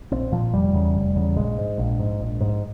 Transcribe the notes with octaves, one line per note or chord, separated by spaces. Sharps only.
A#1 C4
A#2 F3
F1 G3
E2 C#3
F1
E2 C#3
A#1 G#3
G#2
A#1
G#2
A#1
G#2